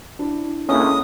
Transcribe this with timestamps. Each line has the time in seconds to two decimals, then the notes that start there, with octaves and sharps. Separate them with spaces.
0.19 D4 E4
0.69 C#2 A2 A#3 C#4 D#6